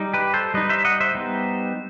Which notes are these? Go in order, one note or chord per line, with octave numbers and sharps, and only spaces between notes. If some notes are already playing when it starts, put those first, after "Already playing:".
Already playing: G3 D#4
G4 B4
A4 C5
G3 D#4 B4 D#5
C5 E5
D#5 F#5
C5 E5
G3 B3 D#4